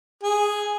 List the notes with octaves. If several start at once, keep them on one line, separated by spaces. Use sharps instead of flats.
G#4